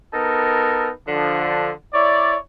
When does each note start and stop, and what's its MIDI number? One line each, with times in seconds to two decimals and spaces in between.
0.13 0.90 59
0.13 0.90 63
0.13 0.90 69
0.13 0.90 70
1.08 1.70 50
1.08 1.70 53
1.94 2.36 64
1.94 2.36 73
1.94 2.36 74